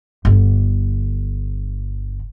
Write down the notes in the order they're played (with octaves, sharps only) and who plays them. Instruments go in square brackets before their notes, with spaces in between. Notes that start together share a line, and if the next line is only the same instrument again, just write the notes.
[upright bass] G1 D3